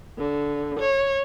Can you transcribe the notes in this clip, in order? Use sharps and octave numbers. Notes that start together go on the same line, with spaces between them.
D3
C#5